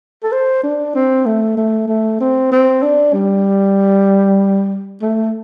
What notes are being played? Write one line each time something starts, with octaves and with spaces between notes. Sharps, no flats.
A4
C5
D4
C4
A3
A3
A3
C4
C4
D4
G3
A3